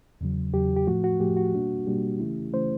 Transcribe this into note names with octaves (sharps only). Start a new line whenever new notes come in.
E2 C#3 F#3
E2 C#3 F#3 G4
G4
A2 F3 A3 F#4
F#4
A2 F3 A3 G4
F#4
B2 G3 A#3 D4
B2 G3 A#3 D4 G4
C#3 E3 A3 C#4 E4
C#3 E3 A3 C#4 E4 C5